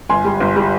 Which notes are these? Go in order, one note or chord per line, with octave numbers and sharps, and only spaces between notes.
G1 G#5 C6
G3
G1
G3